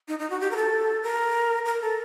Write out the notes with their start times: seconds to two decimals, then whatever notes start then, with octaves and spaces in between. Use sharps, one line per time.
0.08 D#4
0.19 D#4
0.30 F#4
0.40 G4
0.51 A#4
0.56 A4
1.03 A#4
1.66 A#4
1.82 A4